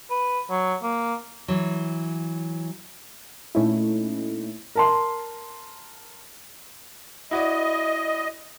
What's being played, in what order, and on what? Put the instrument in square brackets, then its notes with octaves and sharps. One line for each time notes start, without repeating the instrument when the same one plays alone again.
[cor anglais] B4
F#3
A#3
[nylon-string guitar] E3 F#3
[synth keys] A#2 A3 C#4 D#4 E4
[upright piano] A#4 A5 C6
[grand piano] E4 F#4 D5 [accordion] D#5